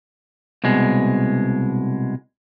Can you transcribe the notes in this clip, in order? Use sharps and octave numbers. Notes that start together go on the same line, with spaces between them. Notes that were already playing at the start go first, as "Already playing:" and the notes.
C2 B2 G#3